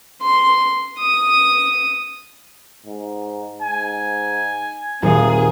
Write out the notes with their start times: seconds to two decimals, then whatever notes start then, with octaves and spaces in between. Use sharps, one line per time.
0.22 C6
0.99 D#6
2.86 G#2
3.62 G#2 G#5
5.03 D#1 C4 G#4 F5